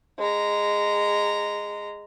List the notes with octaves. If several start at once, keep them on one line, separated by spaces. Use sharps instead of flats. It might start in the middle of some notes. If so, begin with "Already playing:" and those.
G#3 A#5